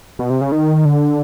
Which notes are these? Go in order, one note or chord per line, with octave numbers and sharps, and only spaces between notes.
B2
C3
C#3
D#3
D3